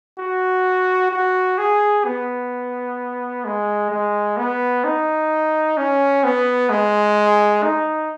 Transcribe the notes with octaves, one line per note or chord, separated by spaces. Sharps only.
F#4
F#4
G#4
B3
G#3
G#3
B3
D#4
C#4
B3
G#3
D#4